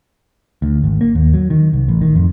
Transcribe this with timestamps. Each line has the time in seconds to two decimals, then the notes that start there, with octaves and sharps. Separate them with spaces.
0.62 D2
0.84 G#1
1.01 A#3
1.15 D#2
1.34 F#3
1.50 D#3
1.73 C2
1.88 A1
2.01 D#3
2.16 F2